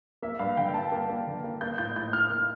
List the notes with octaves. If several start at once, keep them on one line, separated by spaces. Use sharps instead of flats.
A#3 E5
G2 F5
D3 G5
G2 A5
A#3
A#3
D3
A#3
A#3 G6
A2 G6
A2 G6
A2 F6
A#3 F6